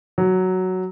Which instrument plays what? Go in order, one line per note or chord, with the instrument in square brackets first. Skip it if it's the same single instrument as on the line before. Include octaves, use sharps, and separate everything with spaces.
[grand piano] F#3